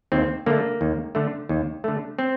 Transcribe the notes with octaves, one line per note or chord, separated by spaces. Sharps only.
D#2 C4
D3 A3 A#3
D#2
D3 A3
D#2
D3 A3
C4